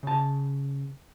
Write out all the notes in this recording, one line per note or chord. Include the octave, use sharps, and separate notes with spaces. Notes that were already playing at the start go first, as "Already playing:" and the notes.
C#3 A5